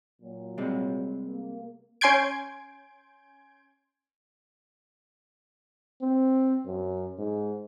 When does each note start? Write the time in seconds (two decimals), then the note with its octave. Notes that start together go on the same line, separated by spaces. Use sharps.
0.21 A#2 F#3
0.58 C3 G3 G#3
1.27 A#3
2.01 C#4 G#5 C6 G6 G#6 D7
6.02 C4
6.66 F#2
7.18 G#2